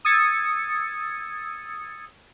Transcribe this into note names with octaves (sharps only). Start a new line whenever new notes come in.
D#6 E6 G#6 A6 C#7